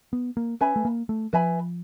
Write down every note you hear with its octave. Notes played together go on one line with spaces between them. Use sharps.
B3
A#3
C#4 B4 E5 G#5 B5
A3
A#3
A3
F3 B4 E5 G#5 B5